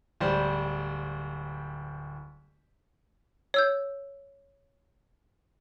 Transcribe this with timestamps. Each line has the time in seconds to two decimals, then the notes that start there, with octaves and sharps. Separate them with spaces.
0.21 D1 G3 C5
3.54 C#5 E6 G6